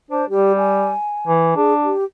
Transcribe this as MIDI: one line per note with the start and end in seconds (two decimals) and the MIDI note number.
0.11 0.24 62
0.11 0.29 72
0.30 0.93 55
0.30 0.53 67
0.58 1.32 80
1.27 1.56 52
1.56 1.91 62
1.56 1.73 68
1.84 2.04 67